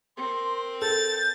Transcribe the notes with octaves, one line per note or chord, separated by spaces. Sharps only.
C4 A#4 C6
A4 G6 A6